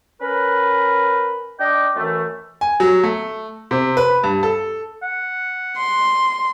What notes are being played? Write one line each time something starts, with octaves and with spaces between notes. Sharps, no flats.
C#4 A#4 B4
D4 D#5 G5 D6
F#2 E3 A3
G#5
F#3
A3
C3
B4
G2
A4
F#5
C6